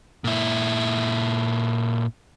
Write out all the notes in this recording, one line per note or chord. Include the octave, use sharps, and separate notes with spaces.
A#2 E4